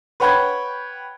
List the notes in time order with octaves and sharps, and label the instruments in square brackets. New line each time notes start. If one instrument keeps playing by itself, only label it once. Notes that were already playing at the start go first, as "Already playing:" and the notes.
[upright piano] B4 C#5 F#5 G5 B5 G#6